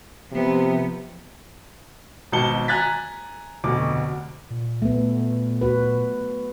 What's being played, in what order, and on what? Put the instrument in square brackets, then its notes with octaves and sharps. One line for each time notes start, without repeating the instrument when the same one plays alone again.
[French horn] C3 [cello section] F3 B3
[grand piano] G#1 B2 A5 C#7 G7
G#5 A#5 F#6 G#6 A6 B6
F1 D2 B2 D6
[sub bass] A#2
[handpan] A3 B3
F#4 B4